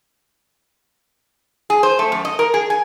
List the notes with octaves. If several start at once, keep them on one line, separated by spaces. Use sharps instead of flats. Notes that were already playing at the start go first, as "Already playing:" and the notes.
G#4
C5
A3
F#2
D#5
A#4
G#4
G#5